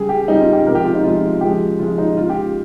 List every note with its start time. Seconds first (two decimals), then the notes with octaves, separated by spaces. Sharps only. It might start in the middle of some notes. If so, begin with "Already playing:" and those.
Already playing: C#3 G3 G#4
0.09 G4
0.28 C#3 G3 D#4
0.41 F4
0.53 G4
0.66 C3 F3 G#3 A#4
0.75 G4
0.85 F4
0.94 D#4
1.04 C3 F3 G#3 F4
1.41 C#3 F3 G#3 G4
1.79 C#3 F3 G#3 F4
1.98 D#4
2.17 C#3 G#3 F4
2.30 G4